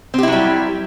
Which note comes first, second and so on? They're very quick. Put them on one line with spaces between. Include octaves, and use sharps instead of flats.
C4 G4 E4 F#3 G3